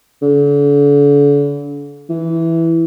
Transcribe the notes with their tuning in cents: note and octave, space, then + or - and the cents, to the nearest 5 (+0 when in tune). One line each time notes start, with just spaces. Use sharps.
D3 -40
E3 +0